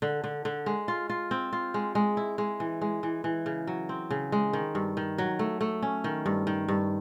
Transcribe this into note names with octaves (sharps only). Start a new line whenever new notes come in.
D3
D3
D3
G#3
F4
F4
C4
F4
G#3
G#3
E4
G#3
E3
G#3
E3
E3
C#3
F#3
C4
C#3
G#3
D#3
G2
D#3
F#3
A3
A3
C#4
D#3
G2
D#3
G2